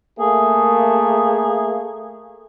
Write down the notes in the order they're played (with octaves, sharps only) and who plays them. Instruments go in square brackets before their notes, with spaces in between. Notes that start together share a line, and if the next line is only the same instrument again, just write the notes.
[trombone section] A3 A#3 [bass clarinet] G#4